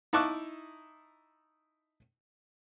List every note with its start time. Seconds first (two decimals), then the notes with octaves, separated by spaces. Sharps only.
0.13 D#4 E4 A5 C#6 D6 F#6